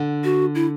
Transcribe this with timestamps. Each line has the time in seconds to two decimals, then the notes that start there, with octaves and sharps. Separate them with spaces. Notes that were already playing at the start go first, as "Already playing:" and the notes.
Already playing: D3
0.24 F#4
0.55 E4